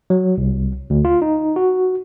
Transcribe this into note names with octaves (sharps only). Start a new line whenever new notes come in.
F#3
C2
D2
F4
D#4
F#4